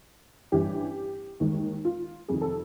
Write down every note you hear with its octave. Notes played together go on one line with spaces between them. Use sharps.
A1 G2 E3 G3 G4
D#2 D#3 G#3
F4
F2 C3 D#3 G#4
A4